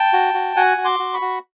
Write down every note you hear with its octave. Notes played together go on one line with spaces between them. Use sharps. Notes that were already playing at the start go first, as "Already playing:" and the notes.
Already playing: G5 A5
F#4
F#4
F#4 F#5 G#5
F#4
C6 D6
F#4
B5 C#6
F#4